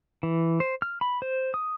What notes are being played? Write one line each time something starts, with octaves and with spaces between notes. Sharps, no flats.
E3
C5
F6
B5
C5
D#6